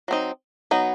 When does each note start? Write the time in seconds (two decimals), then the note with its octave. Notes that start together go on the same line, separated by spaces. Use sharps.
0.08 F#3 C4 D#4
0.71 F#3 B3 D#4